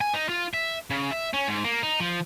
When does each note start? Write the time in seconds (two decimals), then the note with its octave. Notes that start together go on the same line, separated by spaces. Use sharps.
0.01 G#5
0.14 D#4
0.29 F4
0.54 E5
0.90 C#3
1.11 E5
1.33 C#4
1.48 G#2
1.64 A#3
1.83 D#4
2.00 F3